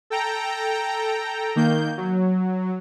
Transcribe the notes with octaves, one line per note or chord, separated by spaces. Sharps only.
A4 G5 A#5
D#3 A#3 G6
F#3